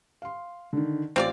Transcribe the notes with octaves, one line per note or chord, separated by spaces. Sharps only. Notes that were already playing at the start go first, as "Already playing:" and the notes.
F5 C6
D3 D#3
A1 C4 F4 D5